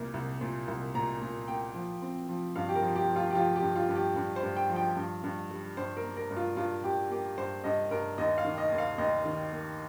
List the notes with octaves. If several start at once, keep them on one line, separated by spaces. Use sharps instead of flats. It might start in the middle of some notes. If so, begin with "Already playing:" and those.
Already playing: C2 A#2 A#3
C2
A#2
C2
A#2 A#5
A#2
A#3 G5
F3
C4
F3
G2 F5
G4
A#4
F3
G4
F3
F4
G4
F3 F4
G4
G2
F4
G2
G4
G2
C5
G2
G5
F3
G5
G2
G2
G3
G2 C5
A#4
A#3
A#4
G2
F4
G2 F4
G2 G4
A#3 G4
G2 C5
G2 D#5
G2 A#4
D#2 D#5
F5
D#3
D#5
D#2
F5
D#2 D#5
D#3
A#3